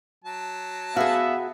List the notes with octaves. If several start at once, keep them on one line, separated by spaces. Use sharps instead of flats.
F#3 A5
B3 F#4 G#4 E5 F5